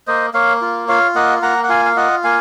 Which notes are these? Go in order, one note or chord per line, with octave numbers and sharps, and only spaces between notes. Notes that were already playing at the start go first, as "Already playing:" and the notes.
A#3 C5 D#5
A#3 C#5 F5
F4
F4 C#5 F5
A#3 D#5 F#5
A#3 F#5 A#5
F#5
F4 F5 G#5
F5
F4 D#5 F#5
A#3 F5 G#5